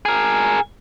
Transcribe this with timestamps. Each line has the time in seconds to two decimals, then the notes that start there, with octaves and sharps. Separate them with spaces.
0.06 G#4 A#4